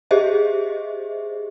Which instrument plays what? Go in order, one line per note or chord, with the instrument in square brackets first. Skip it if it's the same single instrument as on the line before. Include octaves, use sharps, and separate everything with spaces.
[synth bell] G4 G#4 C5 D#5 E5